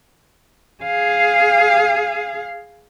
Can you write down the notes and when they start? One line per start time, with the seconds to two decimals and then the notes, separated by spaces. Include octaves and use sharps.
0.84 G#4 F5